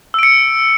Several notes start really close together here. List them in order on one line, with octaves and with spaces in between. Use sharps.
E6 D7 C#7